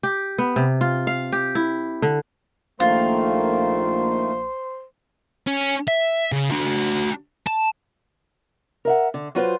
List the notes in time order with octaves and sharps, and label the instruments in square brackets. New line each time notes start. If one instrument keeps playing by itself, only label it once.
[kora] G4
B3
C3
F4
F5
G4
E4
D3
[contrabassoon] A#1 [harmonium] D#3 A3 A#3 [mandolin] F4 [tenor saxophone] C5
[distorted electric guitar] C#4
E5
C#3
D4 F#4
A5
[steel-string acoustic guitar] A#4 E5 F#5
D3
F#3 F4 B4 C5